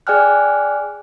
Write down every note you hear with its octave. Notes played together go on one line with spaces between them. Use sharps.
G#4 D5 G5 G#5 F6 F#6